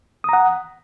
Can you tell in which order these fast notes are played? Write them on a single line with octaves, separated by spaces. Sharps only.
D#6 A#5 F#5